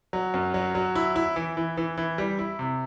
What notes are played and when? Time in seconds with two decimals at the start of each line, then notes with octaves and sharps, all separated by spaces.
0.13 F#3
0.34 F#2
0.54 F#3
0.75 F#3
0.95 E4
1.16 E4
1.36 E3
1.57 E3
1.77 E3
1.98 E3
2.18 G3
2.39 E4
2.59 C3